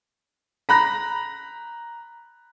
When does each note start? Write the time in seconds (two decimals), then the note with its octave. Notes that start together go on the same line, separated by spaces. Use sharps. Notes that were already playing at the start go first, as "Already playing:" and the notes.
0.69 A#5 B5 F#6 A#6